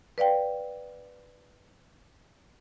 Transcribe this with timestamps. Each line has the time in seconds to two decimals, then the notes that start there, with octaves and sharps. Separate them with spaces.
0.18 B4 D5 F5 G5